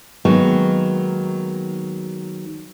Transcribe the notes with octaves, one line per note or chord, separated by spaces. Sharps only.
D#3 F#3 G#3 A#3 B3